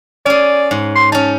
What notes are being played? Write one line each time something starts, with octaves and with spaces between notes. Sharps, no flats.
C#4 G#4 D5
G#2
C6
C#4 D#4 A5